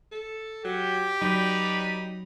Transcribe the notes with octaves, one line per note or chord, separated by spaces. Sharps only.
A4
F#3 G4
F#3 D#4 B4 D5 B5